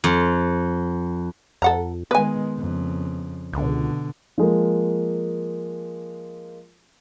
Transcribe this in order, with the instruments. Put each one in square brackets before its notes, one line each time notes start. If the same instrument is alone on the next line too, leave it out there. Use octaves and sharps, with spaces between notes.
[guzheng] F2
[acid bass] F2 [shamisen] A4 F#5 A#5
[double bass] D#3 G#3 [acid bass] B3 [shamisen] B4 G#5
[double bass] F2 C#3
[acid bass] C#2 [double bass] B2 D3
[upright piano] F3 G#3 A#3